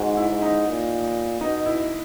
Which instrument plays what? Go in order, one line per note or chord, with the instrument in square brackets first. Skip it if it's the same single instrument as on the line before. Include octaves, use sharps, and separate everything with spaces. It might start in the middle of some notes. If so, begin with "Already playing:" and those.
Already playing: [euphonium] G#2 [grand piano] F#4
[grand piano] E4
[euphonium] G#2
[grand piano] D#4
[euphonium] A#2
[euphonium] B2 [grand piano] D#4
[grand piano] E4